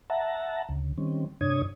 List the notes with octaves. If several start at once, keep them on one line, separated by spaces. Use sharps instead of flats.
E5 F#5 A5 A#5
D2 C#3
D#3 G3 C4 C#4
G2 C3 D4 C#5 D#6 G#6